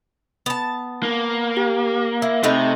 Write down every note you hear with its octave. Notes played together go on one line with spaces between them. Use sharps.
B3 A5
A#3
G4
E4 E5
C3 A3 D#4 B4